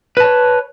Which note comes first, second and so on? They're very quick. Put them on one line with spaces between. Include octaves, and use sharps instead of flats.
B4 A5 C#5